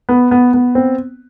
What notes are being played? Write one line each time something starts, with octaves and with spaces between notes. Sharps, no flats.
B3
B3
B3
C4